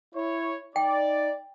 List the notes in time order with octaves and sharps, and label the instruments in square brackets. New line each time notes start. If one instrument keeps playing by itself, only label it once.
[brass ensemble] E4 C#5
[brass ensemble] D#4 D5 [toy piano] G5